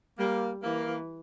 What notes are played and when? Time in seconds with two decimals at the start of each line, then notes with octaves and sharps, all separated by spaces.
0.19 G3 A#3
0.63 E3 A#3